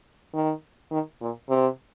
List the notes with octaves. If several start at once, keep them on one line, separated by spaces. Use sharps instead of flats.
D#3
D#3
A#2
C3